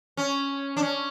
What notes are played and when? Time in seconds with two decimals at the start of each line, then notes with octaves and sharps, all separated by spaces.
0.17 C#4
0.77 D4
0.82 C#4